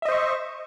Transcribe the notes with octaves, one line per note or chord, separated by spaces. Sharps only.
C5 D#5 E5 C#6